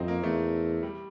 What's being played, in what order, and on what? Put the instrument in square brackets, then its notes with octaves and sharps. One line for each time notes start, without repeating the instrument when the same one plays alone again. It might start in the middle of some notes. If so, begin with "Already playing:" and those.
Already playing: [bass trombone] F2 [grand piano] C4 D#4 E4
[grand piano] A#3
[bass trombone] E2 [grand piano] A3
[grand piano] G3